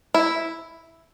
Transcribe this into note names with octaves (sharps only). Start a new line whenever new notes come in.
E4